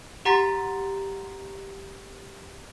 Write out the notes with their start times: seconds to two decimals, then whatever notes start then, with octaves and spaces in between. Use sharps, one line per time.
0.25 G4 F#5 A#5 C6 A6 B6